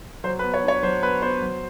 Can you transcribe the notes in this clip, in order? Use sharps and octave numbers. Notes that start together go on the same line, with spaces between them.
F#3 C5
B4
B3
C#5
D4 C#5
F#3 C5
B3 B4
B3 C5
F#3